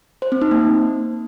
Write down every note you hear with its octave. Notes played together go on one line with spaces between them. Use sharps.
C5
C4
D#4
A#3